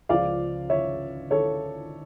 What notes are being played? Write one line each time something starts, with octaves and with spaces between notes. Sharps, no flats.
C#2 C#3 F3 D5 F5
C#5 E5
A4 C#5